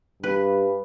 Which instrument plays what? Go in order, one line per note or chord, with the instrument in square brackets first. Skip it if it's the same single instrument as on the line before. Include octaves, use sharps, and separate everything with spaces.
[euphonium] G2 [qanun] B4